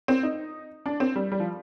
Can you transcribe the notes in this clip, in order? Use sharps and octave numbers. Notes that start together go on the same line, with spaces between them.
C4
D#4
D4
C4
G3
G3
F3